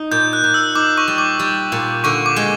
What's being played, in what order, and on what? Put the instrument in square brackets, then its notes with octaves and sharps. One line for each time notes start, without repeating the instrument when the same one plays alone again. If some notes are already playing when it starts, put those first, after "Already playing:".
Already playing: [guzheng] D#4
[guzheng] A#2 [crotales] G6
[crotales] F#6
[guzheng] A#2
[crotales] E6
[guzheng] D#4 [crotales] D6
[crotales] C#6
[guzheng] G3
[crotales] D6
[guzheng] G3
A#2
[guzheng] D3 [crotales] C#6
[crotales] D6
[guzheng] G#3